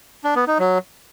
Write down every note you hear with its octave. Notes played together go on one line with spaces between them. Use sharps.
D4
B3
D#4
F#3